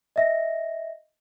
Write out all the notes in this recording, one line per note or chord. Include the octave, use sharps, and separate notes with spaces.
D#5 E5 A#6